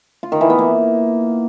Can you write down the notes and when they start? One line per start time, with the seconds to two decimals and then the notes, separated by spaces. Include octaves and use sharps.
0.23 F4
0.32 D#3
0.41 E3
0.50 B3
0.59 A#3